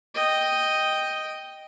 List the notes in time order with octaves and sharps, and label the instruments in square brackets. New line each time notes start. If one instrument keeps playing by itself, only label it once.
[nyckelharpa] D#5 G5